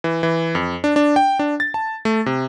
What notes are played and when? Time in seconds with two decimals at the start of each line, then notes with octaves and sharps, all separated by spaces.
0.04 E3
0.23 E3
0.55 F2
0.84 D4
0.96 D4
1.16 G5
1.39 D4
1.60 A6
1.74 A5
2.05 A3
2.26 C3